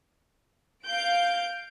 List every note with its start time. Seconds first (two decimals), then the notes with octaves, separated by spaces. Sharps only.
0.85 F5 G6 D7